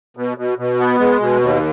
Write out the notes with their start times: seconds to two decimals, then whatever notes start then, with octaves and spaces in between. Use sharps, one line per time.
0.17 B2
0.38 B2
0.58 B2
0.79 B3
1.00 G#3
1.20 B2
1.42 D#2